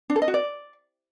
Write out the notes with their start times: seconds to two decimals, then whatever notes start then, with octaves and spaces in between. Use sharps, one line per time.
0.10 D4
0.16 A4
0.22 D#5
0.28 F#4
0.34 D5